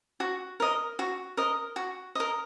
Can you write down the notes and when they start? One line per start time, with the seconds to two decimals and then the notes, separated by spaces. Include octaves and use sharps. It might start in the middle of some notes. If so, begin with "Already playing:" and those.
0.20 F#4
0.60 A#4 D#5
0.99 F#4
1.37 A#4 D#5
1.76 F#4
2.15 A#4 D#5